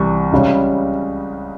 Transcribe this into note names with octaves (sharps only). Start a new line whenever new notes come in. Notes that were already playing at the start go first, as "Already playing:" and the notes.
Already playing: C2 C3 E3 G3 C#6
C#2 C#3 G3 C#4